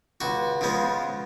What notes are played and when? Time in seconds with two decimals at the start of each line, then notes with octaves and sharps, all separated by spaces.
0.21 C#2 F#4
0.61 C#3 F3 G#3 B3